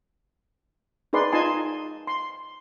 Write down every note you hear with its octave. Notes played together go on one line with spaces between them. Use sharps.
D#4 G#4 B4 D5 C6
D#4 F4 D#5 G#5 A5 C6
C6